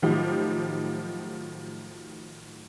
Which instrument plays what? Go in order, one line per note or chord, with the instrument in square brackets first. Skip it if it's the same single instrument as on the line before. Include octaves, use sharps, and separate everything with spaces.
[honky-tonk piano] A2 D#3 F3 F#3 D#4 G4